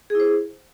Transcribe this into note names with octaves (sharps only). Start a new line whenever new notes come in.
E4 G#4 C5